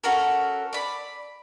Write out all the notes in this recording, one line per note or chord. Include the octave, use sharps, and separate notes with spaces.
C#4 F#4 A4 A#4
D5 B5